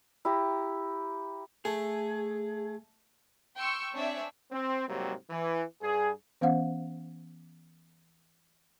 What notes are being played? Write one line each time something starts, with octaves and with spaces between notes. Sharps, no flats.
E4 G4 A#5
A3 G#4
G5 C6 C#6 E6 C#7
C4 D4 C#5 D5 E5 G#5
C4
G#2 C3 F#3 G3 A#3
E3
G2 G#4
E3 B3 C#4 C5 F5 F#5